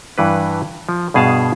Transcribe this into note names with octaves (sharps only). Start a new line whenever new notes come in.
G2 E3 B4
F3
G2 B2 G#4 F5 A5